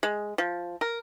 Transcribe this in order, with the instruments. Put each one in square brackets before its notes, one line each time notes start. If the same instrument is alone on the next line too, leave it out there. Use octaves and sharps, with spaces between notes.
[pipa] G#3
F3
A#4